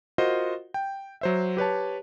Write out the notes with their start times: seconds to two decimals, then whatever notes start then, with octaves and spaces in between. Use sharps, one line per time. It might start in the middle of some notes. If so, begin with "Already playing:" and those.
0.18 F4 F#4 A#4 C5 D#5
0.74 G5
1.21 F#3 C5 E5
1.57 G4 B4 C#5 A5